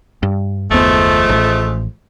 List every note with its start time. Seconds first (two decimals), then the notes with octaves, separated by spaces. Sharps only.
0.23 G2
0.71 F#1 D#2 F3 G#3 A3 B3
1.29 A1